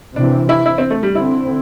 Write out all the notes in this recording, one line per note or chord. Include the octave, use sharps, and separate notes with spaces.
C3 E3 C4 D4
E4
E4
C4
A3
G3
D3 C4 E4